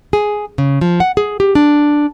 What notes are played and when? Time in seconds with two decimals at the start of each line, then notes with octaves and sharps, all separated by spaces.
0.13 G#4
0.58 C#3
0.81 F3
1.00 F#5
1.17 G#4
1.40 G4
1.55 D4